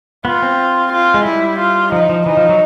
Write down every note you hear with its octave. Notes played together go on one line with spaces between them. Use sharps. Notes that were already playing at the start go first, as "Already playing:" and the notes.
B3 F4
C4
F4
G#3
G3 E4
F4
F3 D#4
F3
E3 D#4
F3
F#3